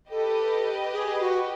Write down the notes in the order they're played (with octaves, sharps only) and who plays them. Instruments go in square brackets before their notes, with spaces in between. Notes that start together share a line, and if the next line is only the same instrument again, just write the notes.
[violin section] G4 B4 D#5 [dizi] A4
[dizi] G#4
F#4